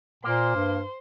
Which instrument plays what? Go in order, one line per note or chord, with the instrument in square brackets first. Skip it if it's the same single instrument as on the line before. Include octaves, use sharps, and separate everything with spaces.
[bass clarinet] A#2 [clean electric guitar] A#3 [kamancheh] C5 C6
[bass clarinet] G2